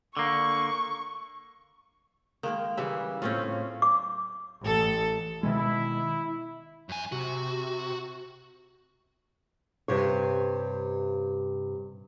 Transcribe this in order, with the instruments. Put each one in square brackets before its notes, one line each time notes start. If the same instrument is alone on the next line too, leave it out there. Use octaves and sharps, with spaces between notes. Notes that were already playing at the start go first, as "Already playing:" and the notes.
[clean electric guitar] D3 A#3 [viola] C#6
[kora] D#3 G#3 A#3 [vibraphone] F5
[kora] C#3 G3 E5 [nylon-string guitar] E3
[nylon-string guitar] A2 A3 [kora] C4 C#4 F4
[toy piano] D6
[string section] A1 A4
[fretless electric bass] B2 D#3 G#3 [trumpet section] E4
[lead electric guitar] F#2 G#5
[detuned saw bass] C3 [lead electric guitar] F#4
[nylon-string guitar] G2 C3 C#5